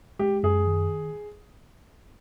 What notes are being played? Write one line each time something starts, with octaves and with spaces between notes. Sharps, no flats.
G#3 G4
F#2 G#4
D#3